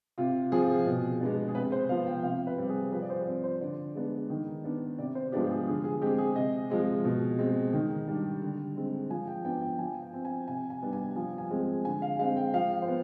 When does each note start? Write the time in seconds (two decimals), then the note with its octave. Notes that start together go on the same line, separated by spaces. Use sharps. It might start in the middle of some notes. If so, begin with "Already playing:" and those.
0.18 C3 F4
0.52 F3 C4 G#4
0.86 B2
1.21 G#3 B3 D4
1.48 G#4
1.55 C3 B4
1.72 C5
1.89 F3 B3 F5
2.07 G5
2.23 C3 F5
2.47 B4
2.58 G3 C4
2.69 G#4
2.92 F3 B4
3.02 D5
3.10 C5
3.21 D5
3.27 C4 C5
3.44 C5
3.61 D3 D5
3.95 G#3 B3 D4
4.30 D#3
4.64 B3 D4
4.98 C3 D5
5.15 C5
5.32 F3 G#3 B3 D4 G4
5.50 G#4
5.67 D3 G#4
5.84 G#4
6.01 G#3 C4 G4
6.18 G#4
6.36 C3 D#5
6.70 F3 G#3 C4
7.05 B2
7.39 G#3 C4
7.73 D#3
8.07 G3 D4
8.42 D3
8.77 G#3 C4
9.10 F3 G#5
9.27 G5
9.45 B3 D4 G5
9.62 G5
9.79 F3 G#5
10.02 G5
10.14 C4
10.25 G#5
10.48 C3 G#5
10.70 G#5
10.82 G3 B3 D4
10.93 G#5
11.16 F3 G#5
11.38 G#5
11.51 G#3 C4
11.85 D3 G#5
12.02 F5
12.19 G#3 C4 F5
12.36 G5
12.54 F3 F5
12.82 C5
12.88 B3